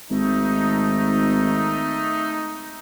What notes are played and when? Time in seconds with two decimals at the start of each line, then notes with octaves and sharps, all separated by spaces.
0.10 G#1 A3 D#4